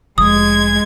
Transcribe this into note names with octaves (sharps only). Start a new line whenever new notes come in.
F1 G#3 D#6 G#6